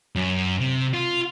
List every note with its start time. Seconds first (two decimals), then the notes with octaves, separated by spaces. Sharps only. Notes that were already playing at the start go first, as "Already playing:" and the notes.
0.16 F#2
0.60 C3
0.94 F4